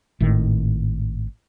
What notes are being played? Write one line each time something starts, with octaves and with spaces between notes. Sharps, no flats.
G#1 A2 D#3